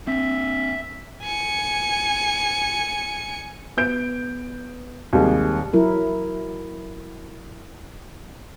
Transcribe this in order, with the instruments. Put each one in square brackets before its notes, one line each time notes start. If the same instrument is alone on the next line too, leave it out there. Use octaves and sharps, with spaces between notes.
[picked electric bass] C4 D4 [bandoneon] E5
[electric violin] G#5 C#7
[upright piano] B3 G6 D7
D#2 C3 D#3 G3 G#3
[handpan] F#3 E4 A#4